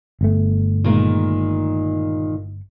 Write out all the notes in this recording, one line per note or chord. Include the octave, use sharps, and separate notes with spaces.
G1 A3
A#2 D#3 G#3